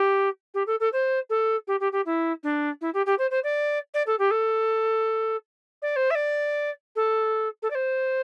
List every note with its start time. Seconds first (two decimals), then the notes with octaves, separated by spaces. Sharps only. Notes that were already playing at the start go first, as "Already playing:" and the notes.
Already playing: G4
0.54 G4
0.67 A4
0.80 A4
0.93 C5
1.30 A4
1.67 G4
1.80 G4
1.92 G4
2.06 E4
2.43 D4
2.81 E4
2.94 G4
3.06 G4
3.18 C5
3.31 C5
3.44 D5
3.94 D5
4.07 A4
4.19 G4
4.31 A4
5.82 D5
5.96 C5
6.10 E5
6.15 D5
6.96 A4
7.62 A4
7.70 D5
7.75 C5